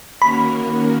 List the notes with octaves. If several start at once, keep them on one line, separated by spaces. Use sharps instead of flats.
D#3 A#3 C#4 F#4 A#4 B5